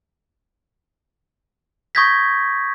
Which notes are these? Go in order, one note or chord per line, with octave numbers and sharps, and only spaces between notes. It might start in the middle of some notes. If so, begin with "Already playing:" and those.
C#6 D#6 G6 G#6 A#6 B6